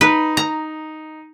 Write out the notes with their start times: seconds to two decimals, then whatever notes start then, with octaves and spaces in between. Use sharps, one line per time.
0.01 D#4 B4
0.37 A#5